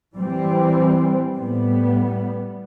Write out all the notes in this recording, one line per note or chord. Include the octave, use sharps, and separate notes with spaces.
E3 G3 C4
A2 G3 B3